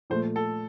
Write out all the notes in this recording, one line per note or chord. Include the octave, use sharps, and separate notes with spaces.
A#2 F3 A3 C5
A4